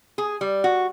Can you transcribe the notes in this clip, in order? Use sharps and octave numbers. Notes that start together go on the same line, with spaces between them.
G#4
G3
F#4